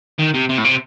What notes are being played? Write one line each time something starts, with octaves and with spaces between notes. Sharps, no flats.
D#3
C3
C3
A2
C3